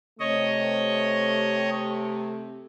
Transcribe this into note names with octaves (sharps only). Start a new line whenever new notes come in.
C3 A3 C#5 D#5